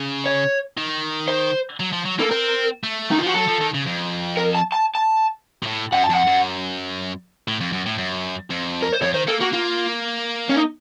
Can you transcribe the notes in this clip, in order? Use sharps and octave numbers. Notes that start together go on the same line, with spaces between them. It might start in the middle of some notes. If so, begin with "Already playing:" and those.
Already playing: C#3
C#5
D#3
C5
F#3
F3
F#3
A#3 A4
C4 A#4
A3
D#3 D#4
F4
F3 F#4
F#3 A4
F3
D#3
C#3
F2
A#4
A5
A5
A5
A#2
A2
F#2 F#5
A5
F2 F#5
F#2
A2
F2
F#2
A2
F#2
F2
A#4
C5
F2 C#5
D#3 C5
A#3 A4
A#3 F#4
A#3 F4
C#4
D#4